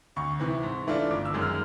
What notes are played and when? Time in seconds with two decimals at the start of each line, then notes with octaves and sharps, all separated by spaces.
0.16 D2 C#6
0.40 C3 E3
0.63 G#2
0.87 E3 A3 D4 F4
1.10 G1 D6
1.25 E6
1.34 F#2 D#3 G#3
1.42 F6